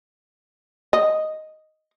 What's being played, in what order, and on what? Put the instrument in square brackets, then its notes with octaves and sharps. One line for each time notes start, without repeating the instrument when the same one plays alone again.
[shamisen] D#5